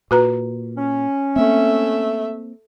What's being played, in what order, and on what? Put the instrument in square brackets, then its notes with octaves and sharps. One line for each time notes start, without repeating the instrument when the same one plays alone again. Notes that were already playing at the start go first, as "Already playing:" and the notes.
[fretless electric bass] A#2 [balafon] F#4 B4 A#5
[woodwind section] C#4
[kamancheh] A3 E5 [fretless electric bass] A#3 C4